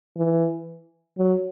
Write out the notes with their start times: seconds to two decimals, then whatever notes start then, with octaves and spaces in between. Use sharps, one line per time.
0.17 E3
1.18 F#3